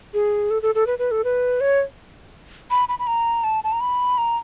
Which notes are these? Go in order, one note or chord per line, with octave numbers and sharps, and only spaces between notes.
G#4
A4
A4
A4
B4
B4
A4
B4
C#5
B5
B5
B5
A#5
A5
A5
A#5
B5
A#5